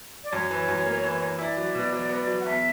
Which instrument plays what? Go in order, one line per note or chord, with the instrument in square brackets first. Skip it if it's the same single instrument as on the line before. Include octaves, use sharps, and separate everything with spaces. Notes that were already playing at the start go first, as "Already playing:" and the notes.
[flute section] D5
[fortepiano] F#2 [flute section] C#5
[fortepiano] E3
F#2
A#3
E3
E3
[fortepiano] E4 [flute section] D5
[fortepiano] F#3
B2
F#3
B3
F#3
[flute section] F#5
[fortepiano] E2 [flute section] E5